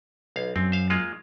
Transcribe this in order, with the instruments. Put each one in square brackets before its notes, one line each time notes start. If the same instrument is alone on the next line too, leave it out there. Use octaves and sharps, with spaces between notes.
[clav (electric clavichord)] B1 F5
[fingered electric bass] F#2 [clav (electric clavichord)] C4
[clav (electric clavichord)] C5 F5
G#3 A#3 F4